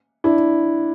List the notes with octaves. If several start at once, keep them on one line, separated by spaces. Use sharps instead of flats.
D4 E4